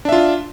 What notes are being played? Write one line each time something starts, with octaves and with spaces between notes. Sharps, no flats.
D4 F4 E5